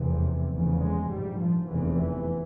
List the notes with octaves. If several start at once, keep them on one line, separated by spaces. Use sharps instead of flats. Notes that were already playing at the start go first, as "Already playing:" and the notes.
Already playing: F1 E2 C3
F1 E2 C#3
G#3
A#1 G#2 G3
F3
F1 E2 C3 E3
E3